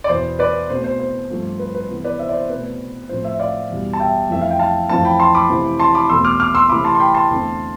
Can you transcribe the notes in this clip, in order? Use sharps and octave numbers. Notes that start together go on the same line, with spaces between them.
D5
E2 B2 B3 C5
B4 D5
B2 A3 C4 C5
C5
C5
G2 F3 A3 C4
B4
B4
C3 E3 B3
B4 D5
C5 E5
D5
C5
B2 A3 C4 B4
A2 F3 A3 C4 C5
C5 E5
D5 F5
E2 B2 G3
A5
E5 G5
F2 E3 A3 C4 E5
F5
G5
F5 A5
F2 E3 A3 C4 F5 A5
G5 B5
A5 C6
B5 D6
C3 E3 A3 C4
A5 C6
B5 D6
E2 B2 A3 C4 C6 E6
D6 F6
D6 F6
C6 E6
C3 E3 A3 C4 B5 D6
A5 C6
C6
G5 B5
A5 C6
E2 D3 A3 C4